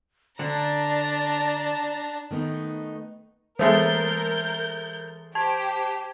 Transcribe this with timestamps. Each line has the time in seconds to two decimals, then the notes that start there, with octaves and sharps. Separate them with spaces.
0.39 D3 D4 D5 A5 A#5
2.31 D#3 A3 B3 D#4
3.59 E3 G#3 A3 B3 A#4 G6 A6
5.35 G4 C5 G5 A5 G#6